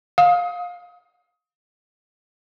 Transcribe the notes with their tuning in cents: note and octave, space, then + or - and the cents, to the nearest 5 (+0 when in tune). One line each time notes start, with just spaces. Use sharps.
F5 +20 D#6 +25